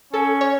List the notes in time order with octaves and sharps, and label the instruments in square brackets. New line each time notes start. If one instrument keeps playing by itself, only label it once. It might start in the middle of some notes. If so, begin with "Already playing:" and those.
[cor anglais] C#4 [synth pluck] A4
[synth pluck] C#5